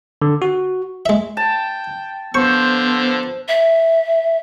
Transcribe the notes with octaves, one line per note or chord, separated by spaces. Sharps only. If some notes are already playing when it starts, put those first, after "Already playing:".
D3
F#4
G#3 E5
G5 A5
D3 F3 B3 C5 C#6 E6
E5